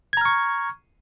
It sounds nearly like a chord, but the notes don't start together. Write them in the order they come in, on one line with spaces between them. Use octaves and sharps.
G#6 A#5 F6 C#6